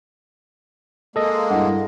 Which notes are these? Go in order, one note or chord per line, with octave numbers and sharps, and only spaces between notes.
G#3 A#3 A4 D#5
G2 E4 F#5